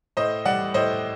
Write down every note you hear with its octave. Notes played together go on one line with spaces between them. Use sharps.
A2 C5 D#5
G3 D5 F#5
A2 C5 D#5